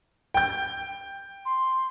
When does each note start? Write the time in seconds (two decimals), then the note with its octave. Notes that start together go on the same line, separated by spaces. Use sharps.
0.34 G5 G6
1.46 C6